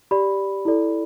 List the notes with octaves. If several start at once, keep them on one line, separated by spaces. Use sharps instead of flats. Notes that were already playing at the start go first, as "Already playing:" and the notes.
G4 D5 B5
E4 A4 D5